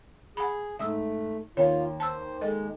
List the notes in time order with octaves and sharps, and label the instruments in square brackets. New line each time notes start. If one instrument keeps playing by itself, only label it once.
[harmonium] G#4 [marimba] F#5 B5
[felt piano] G#2 [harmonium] A3 [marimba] E5 D#6 E6
[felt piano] D#2 [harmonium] F4 [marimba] C#5
[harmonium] C5 [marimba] A5 E6
[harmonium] G#3 [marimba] A4 D#5